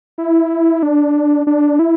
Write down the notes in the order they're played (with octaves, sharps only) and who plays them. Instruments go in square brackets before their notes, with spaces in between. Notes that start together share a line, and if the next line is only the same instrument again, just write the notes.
[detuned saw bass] E4
D4
D4
E4